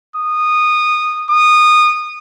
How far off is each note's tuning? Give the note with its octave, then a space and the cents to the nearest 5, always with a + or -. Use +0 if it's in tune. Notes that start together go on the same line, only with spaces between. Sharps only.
D#6 -15
D#6 -20